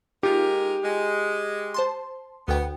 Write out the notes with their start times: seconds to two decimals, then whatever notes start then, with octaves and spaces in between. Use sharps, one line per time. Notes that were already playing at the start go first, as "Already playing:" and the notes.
0.23 G#3 A#3 D#4 F4 G4 A#4
0.84 G#3
1.74 C5 A5 C6
2.48 D2 B3 G5